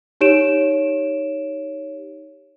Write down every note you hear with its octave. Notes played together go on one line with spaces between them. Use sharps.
D#4 G4 C#5 D7 E7